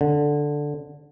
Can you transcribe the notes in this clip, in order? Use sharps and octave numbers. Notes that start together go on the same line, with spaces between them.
D3